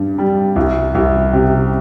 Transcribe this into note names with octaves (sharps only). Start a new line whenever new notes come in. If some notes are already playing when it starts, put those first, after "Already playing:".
Already playing: G2 G3
G3
C2
C2
C3